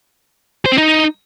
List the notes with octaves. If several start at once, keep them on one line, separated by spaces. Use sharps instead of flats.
C5
C4
D#4